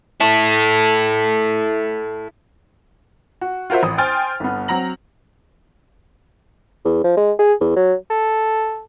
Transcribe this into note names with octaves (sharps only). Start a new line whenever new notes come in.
E4 A4
F#4
F4 F#4 A#4 C5 E5
A1 D#6
C5 G5 G#5 C6 F6 A6
G1 B3
F#3 C4 A#5 A#6 F#7
E2
F3
G#3
G#4
E2
F#3
A4